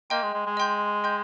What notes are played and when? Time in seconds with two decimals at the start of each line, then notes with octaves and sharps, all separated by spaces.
0.10 A#3 D#5 G5 C6 G6
0.23 G#3
0.34 G#3
0.46 G#3
0.57 D#5 G5 C6 G6
1.04 D#5 G5 C6 G6